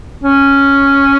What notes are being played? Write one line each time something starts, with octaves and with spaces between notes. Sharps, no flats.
C#4